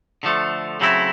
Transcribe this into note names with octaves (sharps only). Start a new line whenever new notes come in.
D3 F3 A3
C#3 F#3 A3 C4 E4